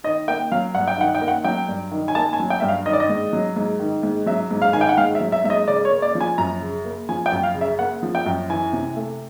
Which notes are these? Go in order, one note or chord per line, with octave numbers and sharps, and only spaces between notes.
D#3 D#5
A#3 G5
F#3 F5
G2 F#5
G5
D#3 F#5
G5
A#3
F#5
F#3 G5
G2
D#3
G#5
A#3 A5
G#5
F#3
G5
G2 E5
F5
D#3 D#5
D5
D#5
G#2
F#3
G#2
D#3
G#2
F#3 E5
G#2
F5
D#3 G#5
G5
F#5
G#2 F5
E5
F#3
E5
G#2 E5
D#5
C#3 D5
C#5
A#3
D5
F3
G#5
F#2 A#5
C#3
A#3
F3 G#5
G5
F#2
F5
C#3
E5
A#3 F#5
F3
G5
F#2
E3 G#5
C3
A3